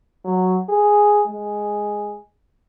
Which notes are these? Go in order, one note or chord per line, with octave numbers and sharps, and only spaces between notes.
F#3
G#4
G#3